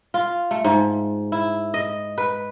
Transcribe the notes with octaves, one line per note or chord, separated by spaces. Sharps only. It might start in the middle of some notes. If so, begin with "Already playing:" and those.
F4
A3
G#2
E4
D#5
B4